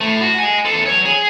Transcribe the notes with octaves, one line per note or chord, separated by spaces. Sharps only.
A2 A3
F#4
D#5 G#5
E2 A4
F#3 C#5
G#4